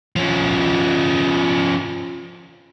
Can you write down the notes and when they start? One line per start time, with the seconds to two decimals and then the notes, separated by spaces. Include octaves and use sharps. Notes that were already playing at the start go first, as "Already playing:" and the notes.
0.16 F3 C#4